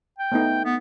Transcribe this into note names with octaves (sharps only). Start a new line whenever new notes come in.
G5
A3 B3 D#4
B3